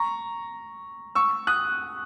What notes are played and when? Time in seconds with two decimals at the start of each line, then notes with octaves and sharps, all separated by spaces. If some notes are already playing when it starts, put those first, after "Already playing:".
Already playing: A#5 C#6
1.15 C#6 E6
1.47 D#6 F#6